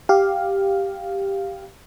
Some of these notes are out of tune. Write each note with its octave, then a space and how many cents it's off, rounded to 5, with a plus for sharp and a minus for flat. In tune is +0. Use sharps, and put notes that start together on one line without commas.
G4 +0 F5 +0